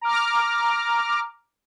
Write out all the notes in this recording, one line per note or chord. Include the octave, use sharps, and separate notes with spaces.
A#5 D6 F6